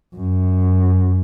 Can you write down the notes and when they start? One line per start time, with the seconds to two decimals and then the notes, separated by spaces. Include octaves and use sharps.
0.16 F#2